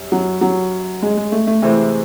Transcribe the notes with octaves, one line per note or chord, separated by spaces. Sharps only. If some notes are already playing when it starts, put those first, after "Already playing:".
Already playing: F#2 G3
F#3
F#3
G#3
G#3
A3
A3
C3 E3 G#3 A3 C4